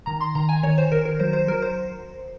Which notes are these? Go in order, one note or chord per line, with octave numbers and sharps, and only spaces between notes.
D#3 A#5
C6
D#3 A#5
G#5
D#3 C#5
C5
D#3 A#4
A#4
F#3 C5
C5
F#3 A#4
C5